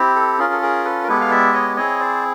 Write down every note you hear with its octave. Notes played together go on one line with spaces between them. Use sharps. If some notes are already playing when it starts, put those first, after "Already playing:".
Already playing: C4 E4 G4
A4
C#4 F4 G#4 A#4
A4
G#4 A#4
A4 B4
A#4
G#3 B3 E4 G4 A4 B4
F5
D5 E5
C#5 D#5
C4 E4 G#4 C#5 D#5
C5 D5